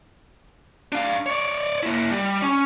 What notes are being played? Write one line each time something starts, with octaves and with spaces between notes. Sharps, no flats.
D4 F5
C#5 D5
A#3 E4
G3
C#4